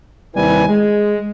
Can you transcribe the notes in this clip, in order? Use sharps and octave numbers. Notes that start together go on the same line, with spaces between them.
D#2 C3 G3 E4 B4 G#5
G#3